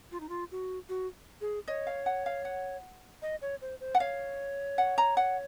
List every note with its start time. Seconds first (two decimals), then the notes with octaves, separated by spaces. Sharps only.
0.12 F4
0.20 D#4
0.29 F4
0.51 F#4
0.89 F#4
1.41 G#4
1.68 C#5 D#5
1.87 F5
2.06 F#5
2.26 F5
2.45 F#5
3.22 D#5
3.42 C#5
3.62 C5
3.81 C5
3.95 F#5
4.00 C#5 F5
4.78 F#5
4.98 A#5
5.17 F#5